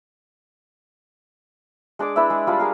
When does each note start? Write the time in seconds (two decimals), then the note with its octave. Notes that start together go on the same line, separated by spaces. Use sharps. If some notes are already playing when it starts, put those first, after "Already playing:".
1.99 G#3 D4 G#4 D6
2.16 D4 E4 B4 E5
2.30 G#3
2.47 G3 F4 A5 B5
2.59 G#4 A#4 F5